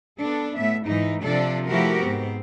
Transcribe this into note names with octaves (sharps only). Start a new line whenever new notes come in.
B3 D4 A4
A2 B3 E5
G#2 E3 G#3 D#4
C3 F3 D4 A4 D5
F3 A3 E4 F#4 G4 A#4
G#2 B3 C4